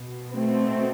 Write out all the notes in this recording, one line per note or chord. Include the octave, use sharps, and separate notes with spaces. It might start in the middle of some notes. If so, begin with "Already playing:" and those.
Already playing: B2
A3 C4